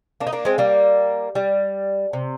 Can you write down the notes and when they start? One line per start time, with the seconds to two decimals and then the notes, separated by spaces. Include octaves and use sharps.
0.20 A#3 D4
0.27 D#4
0.33 A#3 D4
0.45 G#3 C4
0.58 G3 A#3
1.35 G3
2.13 C3